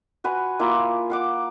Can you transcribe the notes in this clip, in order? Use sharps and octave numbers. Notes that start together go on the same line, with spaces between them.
F#4 B4 F#5 G#5
A#3 E4 F4 D6
F5 F#5 D6